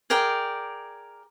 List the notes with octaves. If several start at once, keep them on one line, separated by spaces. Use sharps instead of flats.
G#4 A#4 D5 G5